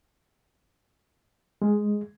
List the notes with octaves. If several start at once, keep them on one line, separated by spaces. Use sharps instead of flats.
G#3